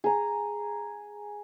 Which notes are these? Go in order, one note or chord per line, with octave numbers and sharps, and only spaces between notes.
G#4 A#5